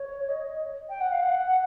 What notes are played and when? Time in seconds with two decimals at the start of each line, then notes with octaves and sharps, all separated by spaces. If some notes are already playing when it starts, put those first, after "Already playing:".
Already playing: C#5
0.28 D#5
0.89 G5
1.00 F#5
1.11 F5
1.22 F#5
1.50 F#5